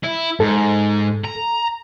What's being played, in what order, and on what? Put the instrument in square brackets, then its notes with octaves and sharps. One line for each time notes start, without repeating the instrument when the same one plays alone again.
[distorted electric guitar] E4
[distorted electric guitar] G#2 [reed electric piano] A4
[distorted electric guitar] A#5